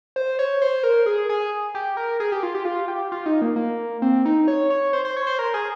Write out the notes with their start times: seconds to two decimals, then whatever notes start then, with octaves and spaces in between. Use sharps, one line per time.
0.16 C5
0.39 C#5
0.62 C5
0.83 A#4
1.06 G#4
1.29 G#4
1.75 G4
1.97 A#4
2.20 G#4
2.32 G4
2.43 F4
2.55 G4
2.65 F4
2.88 G4
3.12 F4
3.26 D#4
3.42 A#3
3.56 A#3
4.02 C4
4.25 D#4
4.48 C#5
4.70 C#5
4.93 C5
5.05 C5
5.17 C#5
5.27 C5
5.39 A#4
5.54 G#4